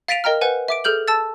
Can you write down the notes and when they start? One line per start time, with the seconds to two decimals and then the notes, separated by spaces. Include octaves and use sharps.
0.08 F5 A6 B6 D7 D#7 F7
0.24 A#4 D#5 G5 A#5 F6
0.41 B4 C5 F#5 G#5
0.68 E5 D6 D7
0.84 G#4 A4 F6 G6 F#7
1.08 A5 E6 A6